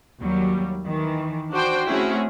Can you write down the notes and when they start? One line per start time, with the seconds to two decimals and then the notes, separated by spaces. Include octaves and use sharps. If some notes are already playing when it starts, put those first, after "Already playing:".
0.21 D#2 F#3 G3
0.86 D#3 E3
1.51 D4 F#4 C5 G5
1.87 A3 C4 C#4 E4 F#4 G#4